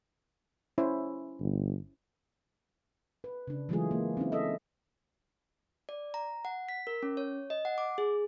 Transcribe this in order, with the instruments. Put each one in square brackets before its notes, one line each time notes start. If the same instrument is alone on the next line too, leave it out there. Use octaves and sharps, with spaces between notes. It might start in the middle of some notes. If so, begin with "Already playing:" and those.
[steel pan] C#4 E4 C5
[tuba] G1
[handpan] B4
C#3 D4
E3 F#3 G#3 A3 F4 G#4
A#3
C4 C#4 D#4 E4
A4 D#5 E5
[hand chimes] D5
A#5
F#5
B6
A#4
C#4
C#5
D#5
F#5
D6
G#4